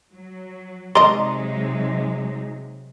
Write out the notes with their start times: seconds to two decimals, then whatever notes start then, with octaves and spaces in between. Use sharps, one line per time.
0.12 F#3
0.95 C3 F#3 G#3 D#4 D5 D#5 A#5 C6